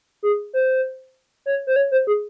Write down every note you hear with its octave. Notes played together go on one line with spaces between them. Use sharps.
G#4
C5
C#5
C5
C#5
C5
G#4